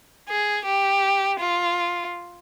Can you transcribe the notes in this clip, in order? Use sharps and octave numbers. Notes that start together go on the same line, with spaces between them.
G#4
G4
F4